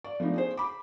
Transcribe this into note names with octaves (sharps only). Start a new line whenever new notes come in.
D5
F3 A3 B3 D4 D#4
C#4 G#4 C5
B5 D6